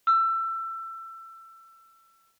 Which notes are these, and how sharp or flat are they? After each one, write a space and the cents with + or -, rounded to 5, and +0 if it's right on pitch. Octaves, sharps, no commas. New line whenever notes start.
E6 +25